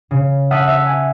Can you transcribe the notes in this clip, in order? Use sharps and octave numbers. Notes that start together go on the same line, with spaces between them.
C#3
E5 F#5 A5 D#6 F6 B6
E5
G#5